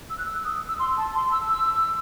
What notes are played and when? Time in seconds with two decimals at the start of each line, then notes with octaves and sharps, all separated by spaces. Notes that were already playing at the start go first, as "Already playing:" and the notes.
0.10 E6
0.18 F#6
0.26 E6
0.45 D#6
0.68 E6
0.79 C6
0.97 A5
1.15 C6
1.32 E6
1.49 E6